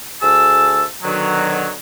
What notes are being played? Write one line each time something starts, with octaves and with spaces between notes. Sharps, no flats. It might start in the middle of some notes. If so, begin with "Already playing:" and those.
D2 G#4 A5 E6
B2 D3 D#3 F#3